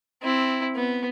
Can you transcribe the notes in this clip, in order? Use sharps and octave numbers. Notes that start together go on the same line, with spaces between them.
C4 E4
B3